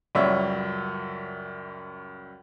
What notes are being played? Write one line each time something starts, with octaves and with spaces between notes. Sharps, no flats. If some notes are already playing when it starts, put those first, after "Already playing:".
C#2 F#2 G3 C#5 E5